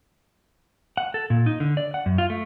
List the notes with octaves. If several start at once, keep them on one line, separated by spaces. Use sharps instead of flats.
F#5
A4
A#2
D#4
D3
D5
F#5
F#2
F4
A3